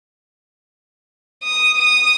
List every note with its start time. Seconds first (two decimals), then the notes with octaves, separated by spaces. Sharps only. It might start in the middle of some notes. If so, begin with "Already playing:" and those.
1.44 D#6
1.78 D#6